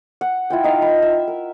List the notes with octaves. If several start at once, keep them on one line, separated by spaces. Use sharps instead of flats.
F#5
E4 F4 G5
D#4 F5
B5
E5
A#4